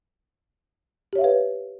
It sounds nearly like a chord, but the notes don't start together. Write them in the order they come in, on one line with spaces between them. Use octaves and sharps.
G4 C#5 E5 F5 B4